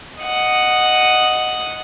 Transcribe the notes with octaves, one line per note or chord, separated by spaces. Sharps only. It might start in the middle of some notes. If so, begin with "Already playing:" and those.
D#5 F#5